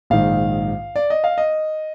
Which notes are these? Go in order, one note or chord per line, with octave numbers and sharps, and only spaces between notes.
A#1 G#2 D#3 F5
D5
D#5
F5
D#5